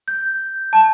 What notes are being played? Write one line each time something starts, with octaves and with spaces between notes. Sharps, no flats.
G6
A5